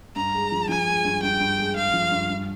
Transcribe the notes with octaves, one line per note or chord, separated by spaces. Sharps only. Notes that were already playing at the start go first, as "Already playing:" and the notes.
G2 A#5
G#3
F3
F3 G#5
G#3
G2
G2 G5
G2
G#3
G#3 F5
F3
G2
G2